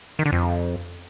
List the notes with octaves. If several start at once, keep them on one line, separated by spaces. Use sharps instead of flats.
D#3
D3
F2